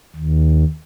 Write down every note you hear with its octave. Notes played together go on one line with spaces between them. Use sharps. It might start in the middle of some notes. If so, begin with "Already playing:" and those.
D#2